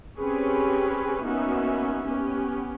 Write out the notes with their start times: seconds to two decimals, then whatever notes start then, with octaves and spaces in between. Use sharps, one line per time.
0.19 C4 C#4 G4 G#4 B4 C#5
1.24 A#3 B3 C#4 D#4 F#4 E5
2.05 B3 C#4 G4